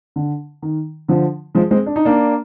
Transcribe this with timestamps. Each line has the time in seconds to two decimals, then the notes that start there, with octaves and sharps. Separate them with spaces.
0.16 D3
0.62 D#3
1.08 D3 F3
1.55 F3 G#3
1.71 G#3 C4
1.86 D4
1.96 D#4
2.05 A#3 D4